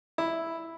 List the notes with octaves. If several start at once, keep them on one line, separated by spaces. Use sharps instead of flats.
E4